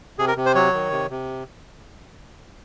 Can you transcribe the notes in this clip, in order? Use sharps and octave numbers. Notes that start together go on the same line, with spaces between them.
C3 G#4
A#4
C3
C5
F#3 C#5
D#3
C3
C3